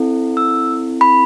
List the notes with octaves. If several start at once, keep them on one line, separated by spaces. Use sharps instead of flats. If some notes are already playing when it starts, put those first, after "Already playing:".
Already playing: C4 E4 A4
E6
B5